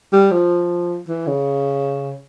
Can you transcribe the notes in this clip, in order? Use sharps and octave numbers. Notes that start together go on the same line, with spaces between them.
G3
F3
E3
C#3